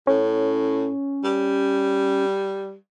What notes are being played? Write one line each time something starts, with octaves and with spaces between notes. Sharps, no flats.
A2 C#4
G3